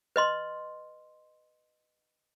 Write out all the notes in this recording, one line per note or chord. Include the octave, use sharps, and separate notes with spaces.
B4 D#5 C6